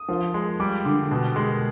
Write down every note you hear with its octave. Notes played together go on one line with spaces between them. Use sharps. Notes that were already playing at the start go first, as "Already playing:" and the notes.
Already playing: D#6
F3
G#3
G3 D6
D3
B2
G#3